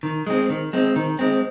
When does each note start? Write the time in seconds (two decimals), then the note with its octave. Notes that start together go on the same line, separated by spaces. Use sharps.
0.03 D#3
0.27 G#3 C4
0.50 D#3
0.73 G#3 C4
0.96 D#3
1.19 G#3 C4